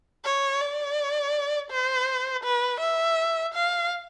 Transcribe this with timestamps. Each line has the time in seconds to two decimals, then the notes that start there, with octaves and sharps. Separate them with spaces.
0.24 C#5
0.61 D5
1.71 C5
2.44 B4
2.80 E5
3.54 F5